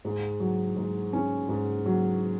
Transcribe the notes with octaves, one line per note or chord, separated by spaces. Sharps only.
G#2
F#3
G#2
C#4
G#2
F#3